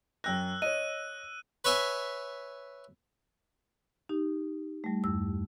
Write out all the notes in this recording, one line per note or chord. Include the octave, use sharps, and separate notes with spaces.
F#2 G5 E6 F#6 A#6
C#5 D#5 D#7
B4 C#5 E5 G#5
D#4 G4
G3 A3
E2 G2 E6